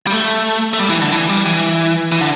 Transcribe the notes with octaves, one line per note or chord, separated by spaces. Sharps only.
G3
A3
A3
G3
E3
D3
E3
G3
E3
E3
D3